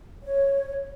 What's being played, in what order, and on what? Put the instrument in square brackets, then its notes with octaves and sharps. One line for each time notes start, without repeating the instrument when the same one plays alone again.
[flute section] C#5